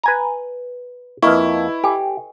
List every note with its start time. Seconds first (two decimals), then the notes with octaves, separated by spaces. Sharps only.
0.03 B4 G#5 A#5
1.22 F2 A#3 E4 B4 D#5 C#6
1.84 G4 A4 G5 G#5